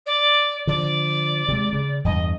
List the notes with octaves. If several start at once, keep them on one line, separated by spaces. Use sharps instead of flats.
D5
D3 F3 D5
C3 G#3
C#3
E2 G2 D#5